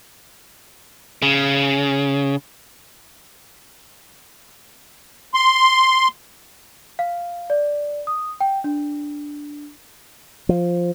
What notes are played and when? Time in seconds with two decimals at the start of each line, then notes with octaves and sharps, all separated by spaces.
1.22 C#3
5.34 C6
6.99 F5
7.50 D5
8.07 D#6
8.41 G5
8.64 D4
10.49 F3